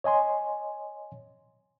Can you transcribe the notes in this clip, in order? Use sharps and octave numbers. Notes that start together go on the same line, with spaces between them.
C#5 D#5 G#5 C6